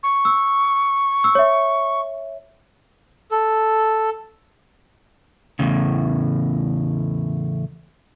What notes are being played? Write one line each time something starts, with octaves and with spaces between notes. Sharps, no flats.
C#6
E6
E6
C#5 E5
A4
E2 A2 C#3